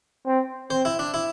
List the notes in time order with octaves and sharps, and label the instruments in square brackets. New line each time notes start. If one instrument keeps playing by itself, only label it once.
[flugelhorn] C4
[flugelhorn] C4 [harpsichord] C5
[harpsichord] E4
D4
E4